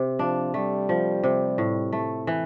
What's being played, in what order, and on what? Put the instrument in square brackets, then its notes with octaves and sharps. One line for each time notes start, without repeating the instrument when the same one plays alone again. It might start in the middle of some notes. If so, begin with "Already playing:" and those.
Already playing: [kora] C3
[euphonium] F3 [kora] D4
[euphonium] G3 [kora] A3
[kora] F3
C3
A2
A3
E3